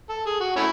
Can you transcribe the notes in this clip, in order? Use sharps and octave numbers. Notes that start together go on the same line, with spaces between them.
A4
G#4
F#4
A3 C#4 E4